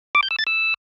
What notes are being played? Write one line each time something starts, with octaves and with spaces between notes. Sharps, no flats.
D6
G6
E6
A6
E6